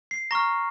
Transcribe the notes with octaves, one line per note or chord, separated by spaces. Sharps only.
C7
A#5 C#6 F6 A#6